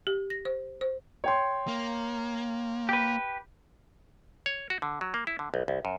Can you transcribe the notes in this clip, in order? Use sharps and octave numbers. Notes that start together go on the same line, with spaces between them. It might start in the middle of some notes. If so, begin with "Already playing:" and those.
G4
A#6
C5
C5
C#5 G5 C6
A#3
G4 B4
C#5
F#4
D3
F#3
A#3
E4
D3
B1
C2
F#2